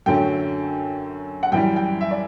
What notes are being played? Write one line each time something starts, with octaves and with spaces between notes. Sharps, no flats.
F#2 D3 F#3 A3 G5
F#5
F#2 E3 G3 G5
G5
E5
D5